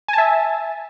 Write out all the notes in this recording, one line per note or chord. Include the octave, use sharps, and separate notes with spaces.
E5 G#5 A5